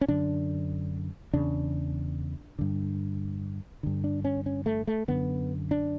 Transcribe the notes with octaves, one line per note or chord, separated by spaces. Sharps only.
C#4
F#2 D3 D4
E2 C#3 D4
G2 D3
G2 D3
D4
C#4
C#4
A3
A3
F#2 D3 B3
D4